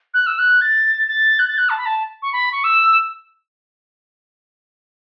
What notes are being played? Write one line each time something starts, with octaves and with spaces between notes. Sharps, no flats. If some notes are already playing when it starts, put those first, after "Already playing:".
F#6
E6
F#6
A6
A6
F#6
A6
F#6
A5
B5
A5
C#6
B5
C#6
E6